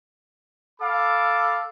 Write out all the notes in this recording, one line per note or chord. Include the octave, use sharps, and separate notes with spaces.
A4 F5 B5 D6